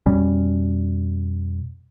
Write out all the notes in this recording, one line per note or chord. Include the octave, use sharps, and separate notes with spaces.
F2 B2 G3 C#4